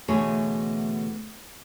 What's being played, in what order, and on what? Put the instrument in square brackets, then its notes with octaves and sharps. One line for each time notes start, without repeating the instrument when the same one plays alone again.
[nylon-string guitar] D2 B2 E3 A3 G#4 C#5